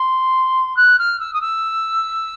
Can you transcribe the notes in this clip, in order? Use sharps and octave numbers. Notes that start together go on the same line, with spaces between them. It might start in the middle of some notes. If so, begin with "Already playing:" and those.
Already playing: C6
F#6
F6
E6
D#6
E6